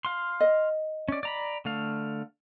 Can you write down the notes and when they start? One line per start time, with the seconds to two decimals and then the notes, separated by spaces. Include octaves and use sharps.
0.05 F5 C6
0.40 D#5
1.08 C#4 D5
1.23 D5 A#5 B5
1.65 D3 A3 F5